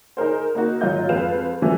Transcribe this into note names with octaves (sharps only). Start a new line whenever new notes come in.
D#4 G#4 A#4 C5
A#3 D#4 F#4
G#1 F#3 F4 D#5 G6
F2 G#3 F4 B4 F5 E7
E3 F3 G3 A3 C#4 E4